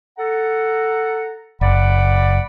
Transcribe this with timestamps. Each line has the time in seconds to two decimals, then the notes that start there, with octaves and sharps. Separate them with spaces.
0.18 A4 F#5 A#5
1.61 F#1 D5 F#5 B5